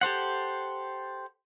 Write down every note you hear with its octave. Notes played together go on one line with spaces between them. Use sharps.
G4 A4 C5 F#5